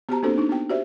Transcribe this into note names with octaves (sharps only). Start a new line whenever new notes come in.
B3 F#4 G4 C5 A5 A#5
A#3 C4 D4 F#4 A4 C5
A#3 D4 D#4
B3 F#4 G5
F#4 G4 C5 D5 E5